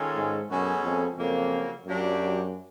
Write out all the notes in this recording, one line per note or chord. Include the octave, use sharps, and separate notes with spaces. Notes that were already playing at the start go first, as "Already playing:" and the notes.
Already playing: D#3 G#3 C#4 F4 A4
G#2
F#2 B2 G#3 C#4 F#4 A4
F2
F2 C#3 F#3 A#3
F#2 F#3 A#3 D4 G4